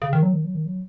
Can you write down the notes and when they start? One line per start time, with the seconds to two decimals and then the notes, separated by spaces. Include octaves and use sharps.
0.02 C#3
0.13 D#3
0.23 F#3
0.34 D#3
0.45 F#3
0.55 D#3
0.66 F#3